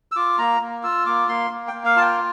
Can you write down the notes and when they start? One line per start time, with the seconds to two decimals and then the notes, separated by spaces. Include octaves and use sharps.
0.12 E6
0.16 F4 D6
0.38 A#3 A#5
0.61 A#3
0.83 F4 E6
1.06 A#3 D6
1.28 A#3 C6
1.51 A#3
1.68 G5
1.73 A#3
1.85 F5
1.96 F4 A5
2.01 G5